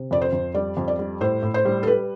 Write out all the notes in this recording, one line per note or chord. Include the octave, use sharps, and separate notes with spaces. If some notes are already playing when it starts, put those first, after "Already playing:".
Already playing: C3
F2 D5
C5
F2
G3 D5
F2
D5
G3
A2 C5
A2
C5
G3
A4
G3 B4